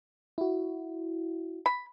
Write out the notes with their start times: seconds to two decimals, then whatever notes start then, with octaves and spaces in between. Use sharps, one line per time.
0.38 E4 F#4
1.66 B5